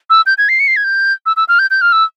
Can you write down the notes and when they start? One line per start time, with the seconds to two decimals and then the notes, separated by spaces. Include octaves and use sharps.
0.10 E6
0.26 G6
0.38 G#6
0.49 C7
0.60 C#7
0.67 C7
0.76 G#6
0.84 G6
1.26 E6
1.36 E6
1.48 F6
1.59 G6
1.70 G6
1.81 F6
1.92 E6